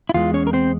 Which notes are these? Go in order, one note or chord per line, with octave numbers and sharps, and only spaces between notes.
E4
E2 E3 G#3 F4
C#4 C#5
A#4
C4 C5